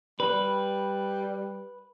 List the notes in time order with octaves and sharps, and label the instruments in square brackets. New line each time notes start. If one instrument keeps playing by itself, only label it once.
[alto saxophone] G3 [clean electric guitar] B4